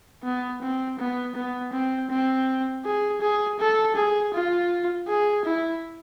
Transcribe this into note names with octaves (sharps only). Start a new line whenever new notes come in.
B3
C4
B3
B3
C4
C4
G#4
G#4
A4
G#4
F4
G#4
E4